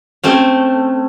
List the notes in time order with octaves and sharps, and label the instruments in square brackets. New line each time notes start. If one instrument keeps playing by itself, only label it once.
[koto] A3 C4 C#4